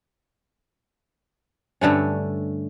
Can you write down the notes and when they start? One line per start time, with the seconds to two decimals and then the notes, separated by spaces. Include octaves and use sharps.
1.81 G2 D3 A3 C#4